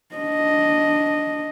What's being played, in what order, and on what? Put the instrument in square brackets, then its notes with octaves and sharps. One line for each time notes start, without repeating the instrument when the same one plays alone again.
[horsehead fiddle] D4 D#5